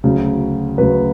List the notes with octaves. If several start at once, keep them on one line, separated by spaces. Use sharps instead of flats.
D2 C#3 F#3
D2 C#3 F#3 B4